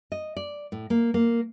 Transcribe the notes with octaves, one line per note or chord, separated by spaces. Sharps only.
D#5
D5
A2
A#3
A#3